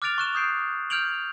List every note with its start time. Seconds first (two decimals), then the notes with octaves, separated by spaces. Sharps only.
0.02 D6 F6 F#6 A6 D7 F7
0.18 C#6 F#6 E7
0.35 D#6 G6 C7 D7
0.90 F6 G6 G#6 D7 F7 F#7